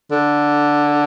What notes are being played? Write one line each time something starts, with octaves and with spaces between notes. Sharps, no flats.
D3